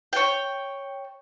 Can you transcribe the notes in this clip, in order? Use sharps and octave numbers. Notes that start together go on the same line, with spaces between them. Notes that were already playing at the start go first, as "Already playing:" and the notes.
C#5 G5